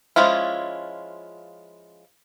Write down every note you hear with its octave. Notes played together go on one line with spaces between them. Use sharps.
F3 G#3 C#4 E4 F4